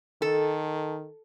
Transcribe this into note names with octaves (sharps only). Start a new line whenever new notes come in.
D#3 A4